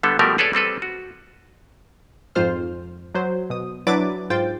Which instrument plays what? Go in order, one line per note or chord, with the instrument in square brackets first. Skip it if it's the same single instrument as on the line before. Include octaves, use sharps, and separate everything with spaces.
[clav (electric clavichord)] D3 G3 B3 A4
B2 F3 G3 A3 G4 A#4
G#4 A4 B4 C#5 D5
G3 C4 A4 B4
F#4
[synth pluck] F2 G#2 F4 C5 F6
F#3 C5
B2 D#6
F#3 D4 E4 B4 D6 A6
G#2 F4 C5 G5 G6 A6